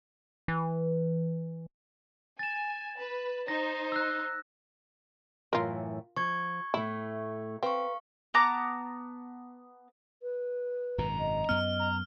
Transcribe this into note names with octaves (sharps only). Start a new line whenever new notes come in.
E3
G#5 A6 E7
B4
D#4 C5 A#6
E6 F#6
F#2 A2 E3 F4 A#4
F3 C#6 G#6
A2 A3 E4
C4 B4 F5 C#6
B3 A5 A#5 D6
B4
G#1 F#2 B2 A#5
D#5
F#2 B3 F6
A#5